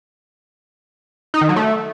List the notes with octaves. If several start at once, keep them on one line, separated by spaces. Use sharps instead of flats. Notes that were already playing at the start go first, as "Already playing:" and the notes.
D#4
D#3
F#3
A3